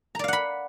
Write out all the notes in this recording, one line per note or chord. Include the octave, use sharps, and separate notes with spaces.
D5 F5 F#5 A#5 B5